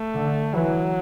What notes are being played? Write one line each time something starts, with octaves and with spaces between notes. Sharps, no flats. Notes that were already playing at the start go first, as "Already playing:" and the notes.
Already playing: A3
D3
E3 F#3